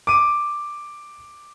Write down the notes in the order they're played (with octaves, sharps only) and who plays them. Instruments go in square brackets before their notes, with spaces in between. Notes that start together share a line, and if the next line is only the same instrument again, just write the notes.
[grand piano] D6 D#7